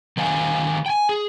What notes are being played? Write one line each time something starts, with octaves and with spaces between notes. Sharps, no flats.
D#3 C5 D#5 F5 G#5
G5 G#5
G#4